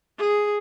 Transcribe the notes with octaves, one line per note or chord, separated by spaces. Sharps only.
G#4